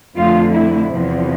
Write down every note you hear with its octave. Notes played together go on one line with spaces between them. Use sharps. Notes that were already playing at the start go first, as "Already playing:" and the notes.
F2 D3 A3 F4
E4
E2 C3 F3